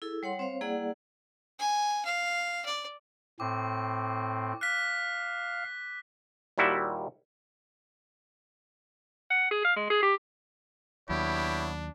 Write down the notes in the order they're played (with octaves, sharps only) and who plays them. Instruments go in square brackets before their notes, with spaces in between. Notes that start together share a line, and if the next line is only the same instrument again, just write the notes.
[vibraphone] E4 G#4 A4
G3 C#5 F#5 C6
C4 C5 C#5 F5
G3 A#3 E4 G#4 D5 F#5
[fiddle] G#5
F5
D5
[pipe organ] A2 C4 [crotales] D6
[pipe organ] F5 [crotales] F#6 B6
[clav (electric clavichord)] D#2 A#2 G3 E4 F#4 E5
[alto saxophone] F#5
G#4
F5
G#3
G#4
G4
[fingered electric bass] D#2 F#3 [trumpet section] B3 E4 C#5 [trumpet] D4 [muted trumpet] G4